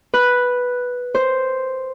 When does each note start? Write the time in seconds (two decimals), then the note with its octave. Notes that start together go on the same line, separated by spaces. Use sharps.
0.14 B4
1.15 C5